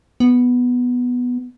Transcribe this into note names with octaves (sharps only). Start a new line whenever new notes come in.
B3